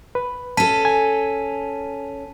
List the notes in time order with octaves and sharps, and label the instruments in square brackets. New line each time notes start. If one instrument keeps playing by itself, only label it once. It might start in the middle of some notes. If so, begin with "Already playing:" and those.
[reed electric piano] B4
[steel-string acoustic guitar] C#4 A4 [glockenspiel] A5 B6 D#7
[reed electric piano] G#5